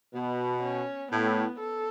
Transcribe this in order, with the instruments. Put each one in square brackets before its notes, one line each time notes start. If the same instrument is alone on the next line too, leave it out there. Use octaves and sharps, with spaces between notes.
[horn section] B2 [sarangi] B3
[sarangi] C#4
[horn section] A2 [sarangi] B3
[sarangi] A4